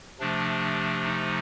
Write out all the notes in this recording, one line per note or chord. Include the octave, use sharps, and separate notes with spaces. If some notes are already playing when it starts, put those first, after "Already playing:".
C3 F3 A3 D4
D#4